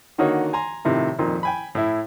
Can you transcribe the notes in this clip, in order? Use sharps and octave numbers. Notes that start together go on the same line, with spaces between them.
D3 D#3 A#3 D#4 F#4 C#5
G#5 A#5 C6
A2 C3 D#3 F3
F2 A#2 D#3
G5 G#5 B5
A2 E4